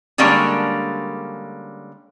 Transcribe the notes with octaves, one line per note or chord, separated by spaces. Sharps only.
D3 G3 G#3 A#3 C#4 D4